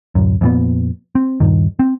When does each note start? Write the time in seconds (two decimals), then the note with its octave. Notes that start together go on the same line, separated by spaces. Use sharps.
0.15 D1 F#2
0.41 F2 A#2 B3
1.15 C4
1.40 D#1 C2 G2 D#3
1.79 C4